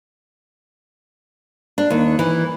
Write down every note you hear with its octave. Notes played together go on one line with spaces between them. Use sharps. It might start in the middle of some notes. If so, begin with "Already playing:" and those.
D4
D#2
E3